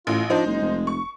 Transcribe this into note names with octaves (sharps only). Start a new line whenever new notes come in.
A1 A2 F4
F3 D4 D#4 C5
F#1 G#3
F1
C#6